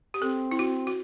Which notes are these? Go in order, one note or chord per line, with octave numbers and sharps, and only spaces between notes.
G4
C4 A4
E4
F#4
F#4